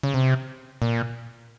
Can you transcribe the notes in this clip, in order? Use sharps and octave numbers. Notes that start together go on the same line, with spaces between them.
C#3
C3
A#2